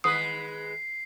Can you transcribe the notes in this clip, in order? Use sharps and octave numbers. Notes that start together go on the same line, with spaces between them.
D#3 G#3 B4 D#6 C7